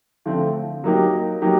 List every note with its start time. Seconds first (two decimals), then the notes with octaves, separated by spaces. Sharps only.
0.26 D3 F3 A3 C4
0.84 F#3 A#3 D#4 G4
1.41 F#3 A#3 D#4 G4